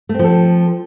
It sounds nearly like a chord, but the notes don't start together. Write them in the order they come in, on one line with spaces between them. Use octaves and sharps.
A3 C4 F3 A4